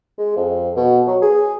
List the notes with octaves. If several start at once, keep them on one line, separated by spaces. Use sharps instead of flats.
G#3
F2
B2
F#3
G#4